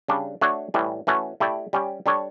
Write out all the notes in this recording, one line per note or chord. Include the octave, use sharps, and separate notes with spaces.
C#3 G3 D4
A3 D4 F#4 C#5
A2 E3 G3
E3 A3 C#4 F#4
A3 E4 G4 D5
G3 C#4 G4
G3 D4 A4 C#5